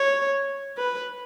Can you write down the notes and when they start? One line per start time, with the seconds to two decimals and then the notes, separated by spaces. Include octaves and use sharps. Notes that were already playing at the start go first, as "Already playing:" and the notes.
Already playing: C#5
0.78 B4